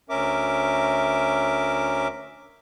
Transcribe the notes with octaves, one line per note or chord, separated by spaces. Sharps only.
D2 C#4 A#4 E5 D6